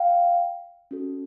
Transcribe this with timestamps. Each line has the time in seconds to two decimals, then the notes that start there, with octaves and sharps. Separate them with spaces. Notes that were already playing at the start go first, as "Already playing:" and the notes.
Already playing: F5 G5
0.91 C#4 F#4 A4